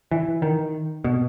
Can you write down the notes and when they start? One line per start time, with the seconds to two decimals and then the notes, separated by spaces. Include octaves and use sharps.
0.11 E3
0.42 D#3
1.04 B2